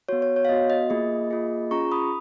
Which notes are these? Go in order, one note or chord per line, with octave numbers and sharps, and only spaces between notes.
B3 F#4 C#5
C#5
C#5
F5
B3 F#4 D#5
D#5
A#3 F4 G#4
A#3 F4 G#4
C#4 F4 G#4 A#5 C#6
B5 D#6